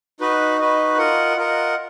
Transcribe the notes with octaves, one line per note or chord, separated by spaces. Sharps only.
D#4 F#4 B4 D#5
D#4 F#4 B4 D#5
F4 A#4 D#5 F#5
F4 A#4 D#5 F#5